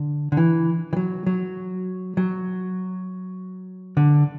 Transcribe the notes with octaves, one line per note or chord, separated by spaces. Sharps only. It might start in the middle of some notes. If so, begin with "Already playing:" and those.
Already playing: D3
D3
E3
E3
F#3
F#3
F#3
D3